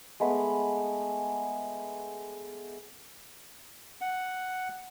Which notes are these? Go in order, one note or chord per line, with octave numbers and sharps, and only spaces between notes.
G#3 A3 B3 B5
F#5